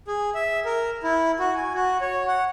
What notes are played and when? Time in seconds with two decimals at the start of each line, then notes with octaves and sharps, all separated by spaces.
0.08 G#4
0.35 E5
0.65 A#4
1.03 E4
1.39 F#4
1.55 G#5
1.75 F#4
2.01 C#5
2.28 F#5